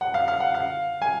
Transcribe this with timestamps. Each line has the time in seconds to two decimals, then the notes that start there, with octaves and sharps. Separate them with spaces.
0.01 F#5
0.14 F5
0.28 F5
0.40 F#5
0.55 F5
1.02 G#5